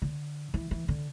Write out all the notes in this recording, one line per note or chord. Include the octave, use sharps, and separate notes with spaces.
D3
E3
E3
D3